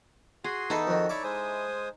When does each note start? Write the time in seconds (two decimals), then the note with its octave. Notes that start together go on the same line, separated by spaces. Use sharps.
0.44 F#4 G#4 C6
0.70 E3 B3 D#4 A4
0.87 F2 D#3 F#4
1.09 E4 C#5 D5 D6
1.24 G#3 C5 G#5 D#6